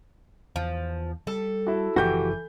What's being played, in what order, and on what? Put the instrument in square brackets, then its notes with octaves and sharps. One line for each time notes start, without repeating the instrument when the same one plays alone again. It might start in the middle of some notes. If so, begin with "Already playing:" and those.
[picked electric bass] E2 [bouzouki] F3
[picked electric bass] G3 [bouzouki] A4
[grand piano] E4 F#4
[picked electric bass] F#1 A2 F3 [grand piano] E3 G6 [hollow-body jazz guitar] F#4 G4